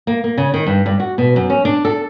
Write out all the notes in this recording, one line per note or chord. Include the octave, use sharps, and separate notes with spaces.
A#3
A#3
C#3
D#3
G2
G2
F#4
B2
F#2
C#4
D4
A4